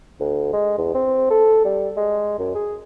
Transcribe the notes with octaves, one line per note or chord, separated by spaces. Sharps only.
D2
G#3
E2
C4
A4
G3
G#3
F#2
G#4